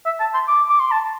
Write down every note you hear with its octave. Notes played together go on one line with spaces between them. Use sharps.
E5
A5
C6
D6
D6
C6
A5